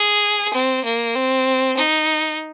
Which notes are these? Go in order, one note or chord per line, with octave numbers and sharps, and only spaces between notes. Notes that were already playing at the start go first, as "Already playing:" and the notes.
Already playing: G#4
C4
A#3
C4
D#4